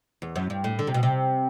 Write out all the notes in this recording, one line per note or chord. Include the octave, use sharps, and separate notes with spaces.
E2
F#2
G2
A2
D3
C3
B2
C3